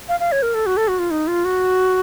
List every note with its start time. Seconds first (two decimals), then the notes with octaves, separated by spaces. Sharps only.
0.09 F5
0.20 F5
0.32 C#5
0.42 A#4
0.54 A4
0.66 F#4
0.77 A4
0.88 F#4
0.99 F4
1.11 D#4
1.27 F4
1.45 F#4